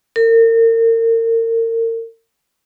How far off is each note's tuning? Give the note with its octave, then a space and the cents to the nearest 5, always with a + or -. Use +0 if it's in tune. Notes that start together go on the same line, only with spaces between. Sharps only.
A#4 -35